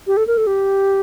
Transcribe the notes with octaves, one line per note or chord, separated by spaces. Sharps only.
G4
A4
A#4
A4
G4